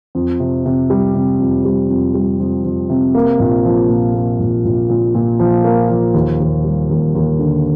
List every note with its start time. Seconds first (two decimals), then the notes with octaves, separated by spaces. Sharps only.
0.15 F2
0.40 C3
0.66 C3
0.90 G3
1.15 C3
1.39 F2
1.65 G3
1.90 F2
2.14 G3
2.40 F2
2.65 F2
2.89 C3
3.15 A#3
3.39 A#1
3.65 F3
3.89 A#2
4.14 A#3
4.40 A#1
4.65 A#1
4.89 A#2
5.15 A#2
5.39 F3
5.64 A#3
5.89 F3
6.14 D#2
6.40 D#2
6.64 G3
6.89 D#2
7.15 D#2
7.39 D3